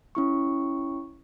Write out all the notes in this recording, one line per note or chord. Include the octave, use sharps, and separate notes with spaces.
C#4 E4 C#6